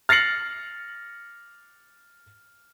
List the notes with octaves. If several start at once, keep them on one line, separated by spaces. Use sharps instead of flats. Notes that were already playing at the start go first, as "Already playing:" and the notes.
F6 A6 A#6 C7 C#7 F#7